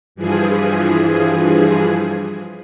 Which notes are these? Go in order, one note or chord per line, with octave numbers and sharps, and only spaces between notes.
G2 E3 F3 G#4